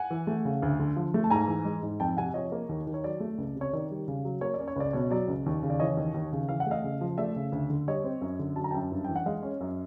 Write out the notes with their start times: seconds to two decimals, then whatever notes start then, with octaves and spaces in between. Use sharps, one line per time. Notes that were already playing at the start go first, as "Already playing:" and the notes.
Already playing: F#5 G#5
0.10 E3
0.27 A3
0.45 C#3
0.62 D2
0.79 D3
0.96 F3
1.14 A3
1.24 A5
1.30 G#2 G#5 A#5
1.48 E3
1.65 G#3
1.83 G#2
2.00 F2 G5 A5
2.17 C3 F#5 G#5
2.34 F3 C#5 D#5
2.52 A#3
2.69 D#2
2.87 D#3
2.94 C#5
3.04 F#3 D5
3.20 A3
3.38 C#2
3.55 C3
3.61 C#5
3.73 D#3 D5
3.91 G3
4.08 C#3
4.25 F#3
4.41 A#3 C#5
4.54 D5
4.60 C#4
4.68 C#5
4.76 C#2 D5
4.93 B2 C#5
5.10 F#3 D5
5.28 C#2
5.46 D#2
5.63 C#3
5.70 D5
5.80 E3 C#5 D#5
5.97 D#2
6.14 D#2
6.32 C#3
6.49 E3 F5
6.60 F#5
6.67 A3 D#5 F5
6.84 C#3
7.01 F3
7.18 A3 D5 E5
7.36 C#3
7.52 D2
7.70 D3
7.87 G3 C#5 D#5
8.04 C4
8.21 F#2
8.39 D3
8.56 F#3 A5
8.64 A#5
8.71 F#2 G5 A5
8.92 G2
9.04 E3 G5
9.16 F#5
9.26 G#3 D#5 F5
9.43 C#4
9.61 F#2